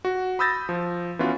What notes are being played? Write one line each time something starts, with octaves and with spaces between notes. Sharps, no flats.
F#4
B5 D#6 E6 G6 A6 A#6
F3
E3 B3 C#4 F4 F#4